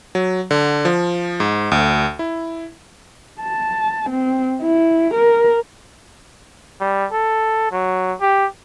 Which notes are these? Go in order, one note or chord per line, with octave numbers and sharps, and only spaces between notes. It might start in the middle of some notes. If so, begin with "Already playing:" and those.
F#3
D3
F3
G#2
D2
E4
A5
C4
E4
A#4
G3
A4
F#3
G4